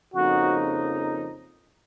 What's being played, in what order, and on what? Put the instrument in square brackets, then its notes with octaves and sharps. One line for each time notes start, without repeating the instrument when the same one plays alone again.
[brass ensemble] F2 C#3 F3 A#3 D#4 [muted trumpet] F#4